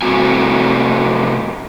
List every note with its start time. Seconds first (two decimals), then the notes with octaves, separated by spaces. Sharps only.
0.02 C3 F3 A3 C4 F#4 G#5